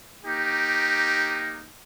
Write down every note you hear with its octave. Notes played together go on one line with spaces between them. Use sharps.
A#3 D#4 G4